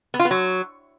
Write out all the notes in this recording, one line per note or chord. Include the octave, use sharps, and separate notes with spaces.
B3
F4
B3
F#3